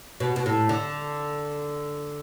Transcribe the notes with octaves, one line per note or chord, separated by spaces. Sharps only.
B2
B2
A2
D3